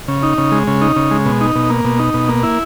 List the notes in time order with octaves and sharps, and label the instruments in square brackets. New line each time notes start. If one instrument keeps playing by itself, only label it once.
[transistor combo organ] C#3
D#4
C#3
G#3
C#3
D#4
C#3
G#3
B2
D#4
B2
A#3
B2
D#4
B2
A#3
E4